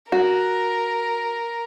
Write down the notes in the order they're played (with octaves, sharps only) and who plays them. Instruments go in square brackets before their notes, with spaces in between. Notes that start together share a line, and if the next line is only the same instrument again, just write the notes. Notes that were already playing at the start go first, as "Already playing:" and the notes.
[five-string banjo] F#4 [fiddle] A#4